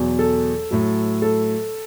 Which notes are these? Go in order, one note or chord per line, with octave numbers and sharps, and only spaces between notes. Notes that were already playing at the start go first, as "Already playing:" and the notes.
Already playing: E2 B2 F#3
A4
A2 F#3
A4